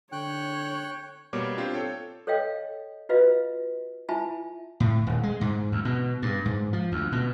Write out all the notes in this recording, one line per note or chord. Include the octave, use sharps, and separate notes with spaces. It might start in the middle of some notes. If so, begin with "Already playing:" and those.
D3 C#5 G5 C#6 F#6
B2 G3 A#3 C#5 D6 G#6
C4 D4 F4 G4 C5 F5
A4 C#5 G5
A4 C#5 D#5 F5 G5
F4 F#4 B4 D#5 F5
E4 F4 E5 G#5 A5 B5
A2
D#1
G#3
G#2
D2
B2
G2
G#2
F3
D2
B2